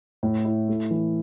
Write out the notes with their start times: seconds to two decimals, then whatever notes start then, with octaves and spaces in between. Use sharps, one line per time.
0.23 A2
0.45 E4
0.68 A3
0.91 E3